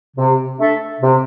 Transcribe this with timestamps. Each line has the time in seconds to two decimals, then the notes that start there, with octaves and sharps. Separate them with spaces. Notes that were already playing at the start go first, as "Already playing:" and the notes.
0.17 C3
0.59 A3 D4 A4 E5
1.01 C3